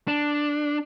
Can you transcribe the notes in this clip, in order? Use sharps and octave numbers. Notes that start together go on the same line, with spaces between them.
D4